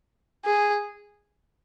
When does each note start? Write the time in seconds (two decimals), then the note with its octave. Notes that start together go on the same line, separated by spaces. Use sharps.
0.45 G#4